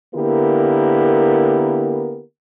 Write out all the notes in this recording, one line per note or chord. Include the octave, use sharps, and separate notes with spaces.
D3 A#3 B3 E4 G4 A#4